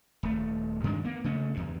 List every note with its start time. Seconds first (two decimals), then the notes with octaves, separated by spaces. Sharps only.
0.23 D#1 A3
0.84 G2 D#3 G#3 D4
1.04 A#3 B3
1.24 C#3 A3 C#4
1.54 E2 G2